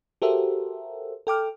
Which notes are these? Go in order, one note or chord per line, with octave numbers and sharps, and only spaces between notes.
F#4 G4 A4 A#4 C5 E5
A4 G5 D6 F6